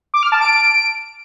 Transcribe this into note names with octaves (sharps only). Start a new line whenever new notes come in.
D6
F6
A5
D7